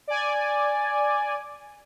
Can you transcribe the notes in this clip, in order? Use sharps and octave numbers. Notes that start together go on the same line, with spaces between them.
D5 G#5